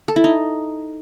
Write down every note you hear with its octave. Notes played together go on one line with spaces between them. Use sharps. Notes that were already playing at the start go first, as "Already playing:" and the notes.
A4
E4
D#4